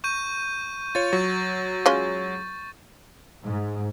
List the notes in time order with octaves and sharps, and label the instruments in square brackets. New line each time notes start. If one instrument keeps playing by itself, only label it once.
[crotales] C#6 G6 D#7
[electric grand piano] F4 C#5 [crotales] A6
[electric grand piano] F#3 [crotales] C#6
[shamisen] G#3 C#4 F4
[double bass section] G#2